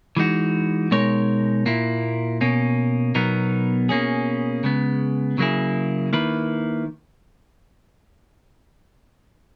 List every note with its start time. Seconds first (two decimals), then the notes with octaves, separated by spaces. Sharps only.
0.17 E3 G#3 D#4 F#4
0.91 B2 G#3 D#4 A#4 C#5
1.66 A#2 A#3 E4
2.41 B2 A#3 C#4
3.15 B2 F#3 B3 D#4 A#4
3.89 B2 A#3 C#4 G#4
4.64 C#3 G#3 B3
5.38 C#3 F#3 A#3 E4 G#4
6.13 D#3 A#3 E4 B4